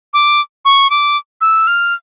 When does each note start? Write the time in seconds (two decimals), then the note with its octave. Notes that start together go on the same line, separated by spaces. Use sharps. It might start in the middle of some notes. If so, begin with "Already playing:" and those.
0.14 D6
0.65 C#6
0.90 D6
1.41 E6
1.67 F6